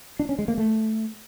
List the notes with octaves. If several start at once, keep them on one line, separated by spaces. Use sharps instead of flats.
D4
C#4
G#3
A#3
A3